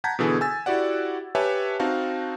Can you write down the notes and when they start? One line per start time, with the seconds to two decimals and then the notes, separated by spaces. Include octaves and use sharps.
0.04 F#5 A5 A#5 G6 G#6 B6
0.19 B2 D3 E3 G#4 A4
0.41 G#5 E6 A6
0.66 E4 F#4 G4 D5 F#5
1.35 G4 B4 C#5 E5 G#5 A5
1.79 C4 D#4 F#4 F5 A5